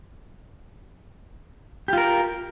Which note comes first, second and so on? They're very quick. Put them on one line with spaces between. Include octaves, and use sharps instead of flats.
G4 F4 A#4